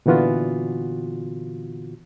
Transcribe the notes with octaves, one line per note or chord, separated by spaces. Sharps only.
A#2 D3 E3 B3 F4 F#4